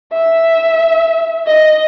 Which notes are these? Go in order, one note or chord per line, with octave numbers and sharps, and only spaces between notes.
E5
D#5